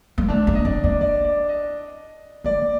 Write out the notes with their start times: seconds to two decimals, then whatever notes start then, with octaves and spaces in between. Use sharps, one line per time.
0.18 A#3
0.29 A3 D4
0.47 A#3
0.55 D#5
0.65 C4 D5
0.84 A#3 D5
1.01 D5
1.25 D5
1.49 D#5
2.44 A#3 D5